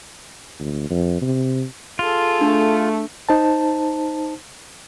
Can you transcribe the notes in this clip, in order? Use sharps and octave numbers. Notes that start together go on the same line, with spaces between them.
D2
F2
C3
F4 G#4 A4
A3 D4
D#4 C5 A5